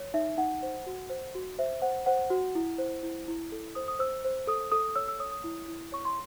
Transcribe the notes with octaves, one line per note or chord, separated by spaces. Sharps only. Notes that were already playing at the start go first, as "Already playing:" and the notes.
Already playing: C#5
D#4 E5
D#4 F#5
C5
F#4
C5
F#4
C5 E5
C5 F#5
C5 F#5
F#4
E4
C5
E4
E4
A4
C5 D#6
D#6
C5 E6
C5
A4 D#6
A4 D#6
C#5 E6
E6
C#5 D#6
D#6
E4
E4
C#5 C#6
C6